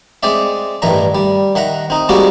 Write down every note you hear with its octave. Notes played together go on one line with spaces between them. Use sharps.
G#3 C4 D5 E5
A1 G2 D#3 E5 A#5
G3
D#3 E5 F#5 A#5
C4 D#4
G3 G#3 A#3 C4 F#4 G4